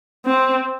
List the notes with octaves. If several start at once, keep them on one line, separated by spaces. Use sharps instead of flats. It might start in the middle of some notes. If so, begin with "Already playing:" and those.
C4